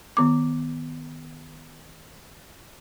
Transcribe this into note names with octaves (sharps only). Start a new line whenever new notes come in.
D#3 B3 D6